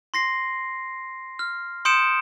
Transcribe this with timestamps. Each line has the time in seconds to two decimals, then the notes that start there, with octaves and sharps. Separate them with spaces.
0.14 C6 A#6 C7
1.39 F6
1.85 C6 D#6 G6 C#7 D7 E7